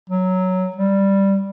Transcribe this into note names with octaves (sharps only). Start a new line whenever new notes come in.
F#3
G3